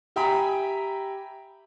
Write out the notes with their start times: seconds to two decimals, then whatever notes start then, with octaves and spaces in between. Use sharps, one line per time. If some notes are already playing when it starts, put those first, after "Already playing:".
0.16 G4 E5 G5 G#5 A#5 B5